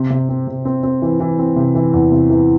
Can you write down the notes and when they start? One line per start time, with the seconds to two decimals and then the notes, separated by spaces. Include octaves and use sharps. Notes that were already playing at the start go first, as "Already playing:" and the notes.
Already playing: C3
0.10 C3
0.29 C4
0.47 C3
0.65 C4
0.83 C4
1.02 E3
1.20 E3
1.38 C4
1.56 C3
1.75 E3
1.93 E2
2.11 C3
2.30 E3